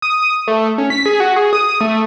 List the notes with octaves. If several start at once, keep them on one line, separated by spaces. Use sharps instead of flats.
D#6
A3
C#4
B6
G#4
F#4
G#4
D#6
A3